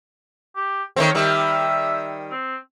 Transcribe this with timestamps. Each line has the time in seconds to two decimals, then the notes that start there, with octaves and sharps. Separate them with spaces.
0.56 G4
0.96 D#3 A3 C4 C#5
1.15 D#3 G3 E5
2.31 C4